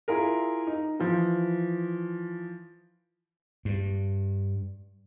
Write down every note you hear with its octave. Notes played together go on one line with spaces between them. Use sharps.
E4 F4 G#4 A#4
D#4
E3 F3
G2